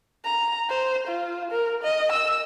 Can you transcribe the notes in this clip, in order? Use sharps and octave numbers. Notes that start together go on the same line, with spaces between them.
A#5
C5
F4
A#4
D#5
E6